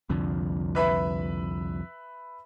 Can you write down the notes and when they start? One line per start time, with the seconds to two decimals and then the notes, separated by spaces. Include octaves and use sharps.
0.10 C2 F2 D3
0.75 B4 E5 B5